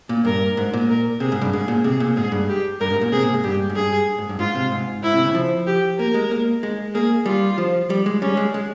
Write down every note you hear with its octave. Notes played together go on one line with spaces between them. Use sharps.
A#2
G2 A#4
G#2
A#2
A#4
C3 G#4
G#2
G2
G#2 G#4
A#2
C3 G#4
A#2
G#2 G#4
G2
G4
G2 A#4
G#2
A#2
C3 G#4
A#2
G#2
G2 G4
G#2
G2 G#4
G#2
G2
G#2 F4
C3
G#2
G#2 E4
C3
C#3
F3
G4
A#3 A#4
G#3
A#3
G#3
A#3 G#4
G3 F4
F3
G3
G#3
G3 C#4
G#3
G#3